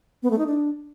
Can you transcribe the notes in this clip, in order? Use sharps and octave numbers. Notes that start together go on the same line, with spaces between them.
B3
A3
D#4
D4